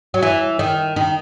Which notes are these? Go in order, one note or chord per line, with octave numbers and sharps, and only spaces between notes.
F#3
E3
D#3
D#3